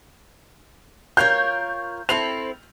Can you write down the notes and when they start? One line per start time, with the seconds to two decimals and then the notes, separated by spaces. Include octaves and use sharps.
1.17 F4 A#4 C#5 G6
2.09 C4 E4 A4 F7